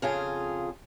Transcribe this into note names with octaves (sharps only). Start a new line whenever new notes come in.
F2 C#3 F4 G#4